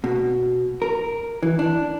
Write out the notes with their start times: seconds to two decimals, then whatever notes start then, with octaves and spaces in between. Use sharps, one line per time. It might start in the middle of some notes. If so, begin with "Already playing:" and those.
0.04 B2
0.82 A#4
1.43 E3
1.59 D4